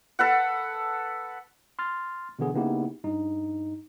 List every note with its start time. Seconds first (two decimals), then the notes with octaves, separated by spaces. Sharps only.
0.19 A4 B4 F#5
1.79 C6 F6 A6
2.39 B2 D3 E3 B3 G#4
2.54 C#3 A#3 B3 D#4 E4 G4
3.04 G2 D#4